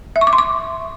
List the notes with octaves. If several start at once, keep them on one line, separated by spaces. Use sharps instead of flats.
E5
C#6
D6
C6
D6